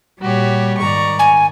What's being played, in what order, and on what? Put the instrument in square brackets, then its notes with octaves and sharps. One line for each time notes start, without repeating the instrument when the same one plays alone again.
[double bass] A#2 [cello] G3 [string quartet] F#4 G4 C#5
[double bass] G#2 D#3 [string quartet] D5 A#5 C#6
[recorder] G#5